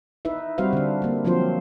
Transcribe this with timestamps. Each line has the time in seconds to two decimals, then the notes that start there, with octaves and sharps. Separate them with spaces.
0.25 D#4 E4 B4 E5
0.58 G3 C4 F#4 B4 C5 F5
0.73 D3 D4
1.02 A#3 D4
1.25 F3 F#3 C4 F4 C5